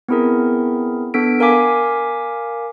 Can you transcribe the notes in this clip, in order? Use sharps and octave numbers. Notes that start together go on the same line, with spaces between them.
B3 C4 E4 G#4 A#4
B3 D4 A4 B6 D7
A#4 F5 G#5 D6 B6